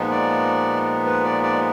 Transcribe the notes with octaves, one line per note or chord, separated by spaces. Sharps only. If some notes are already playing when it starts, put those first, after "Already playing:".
Already playing: A#2 F3 G#3 B3 D#4
D5
B4
D5
D5